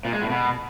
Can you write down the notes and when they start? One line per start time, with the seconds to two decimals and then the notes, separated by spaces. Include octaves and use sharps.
0.05 A#2
0.13 G#3
0.22 A2
0.30 B2